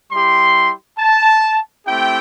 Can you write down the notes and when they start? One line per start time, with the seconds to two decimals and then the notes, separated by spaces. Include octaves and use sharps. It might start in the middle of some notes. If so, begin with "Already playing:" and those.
0.11 G3 E4 G4 C6
0.99 A5
1.85 A3 C4 E4 G4 G5